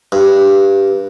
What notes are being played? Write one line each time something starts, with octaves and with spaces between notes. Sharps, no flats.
G2